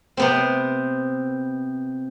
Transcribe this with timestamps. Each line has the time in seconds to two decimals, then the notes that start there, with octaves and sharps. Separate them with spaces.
0.17 C3 B3 C4